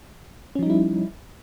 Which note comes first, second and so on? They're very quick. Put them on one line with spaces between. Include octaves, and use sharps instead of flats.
C#4 F3 D#4 G3 E4